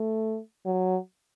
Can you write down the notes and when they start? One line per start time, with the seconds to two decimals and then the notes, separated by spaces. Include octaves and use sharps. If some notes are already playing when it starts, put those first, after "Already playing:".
Already playing: A3
0.66 F#3